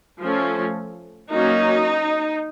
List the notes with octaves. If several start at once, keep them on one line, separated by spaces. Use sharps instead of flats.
F3 A3 C#4
F#3 A#3 C#4 D#4